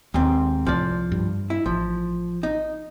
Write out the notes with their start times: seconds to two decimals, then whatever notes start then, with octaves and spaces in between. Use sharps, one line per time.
0.14 D#2 G#2 C4
0.66 C2 A2 F3 D5
1.12 G2
1.50 E4
1.66 A1 F3
2.43 D#4